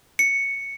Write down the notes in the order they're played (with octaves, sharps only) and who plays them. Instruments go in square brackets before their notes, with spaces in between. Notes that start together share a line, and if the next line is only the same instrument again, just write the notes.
[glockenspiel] C#7